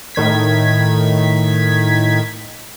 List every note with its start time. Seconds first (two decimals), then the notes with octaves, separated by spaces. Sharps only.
0.15 A2 D#3 G#6 B6